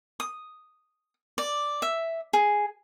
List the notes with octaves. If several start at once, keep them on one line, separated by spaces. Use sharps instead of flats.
D#6
D5
E5
G#4